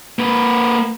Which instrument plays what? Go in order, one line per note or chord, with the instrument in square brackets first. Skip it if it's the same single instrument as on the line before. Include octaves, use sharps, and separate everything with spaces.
[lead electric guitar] A#3 B4